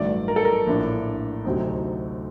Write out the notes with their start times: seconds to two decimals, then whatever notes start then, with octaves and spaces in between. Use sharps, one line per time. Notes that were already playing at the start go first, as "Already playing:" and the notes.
Already playing: A1 G2 D#3 F#3 A3 D5
0.28 A#4
0.36 A4
0.45 A#4
0.67 A#1 A2 A3 D4
1.45 D2 C3 F#3 C4 D#4